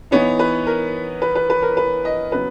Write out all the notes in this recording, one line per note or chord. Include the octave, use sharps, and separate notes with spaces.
E3 B3 D#4 C#5
B4
A#4
B4
B4
B4
A#4
B4
D#5
C#3 F#3 B3 B4